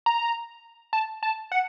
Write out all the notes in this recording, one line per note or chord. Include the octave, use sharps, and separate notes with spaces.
A#5
A5
A5
F#5